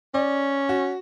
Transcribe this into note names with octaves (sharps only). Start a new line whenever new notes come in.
C#4 D5
F#4